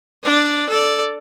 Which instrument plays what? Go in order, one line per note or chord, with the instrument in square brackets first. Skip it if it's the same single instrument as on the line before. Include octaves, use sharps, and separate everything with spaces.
[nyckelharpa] D4 D5
A4 D5